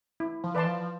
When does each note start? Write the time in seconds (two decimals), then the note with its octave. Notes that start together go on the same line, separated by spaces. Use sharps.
0.20 E4
0.44 F3
0.55 E3 B4 D5 A5 C6
0.66 F3